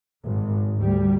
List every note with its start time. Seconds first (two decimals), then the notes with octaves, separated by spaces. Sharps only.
0.25 G#1
0.79 D2 G3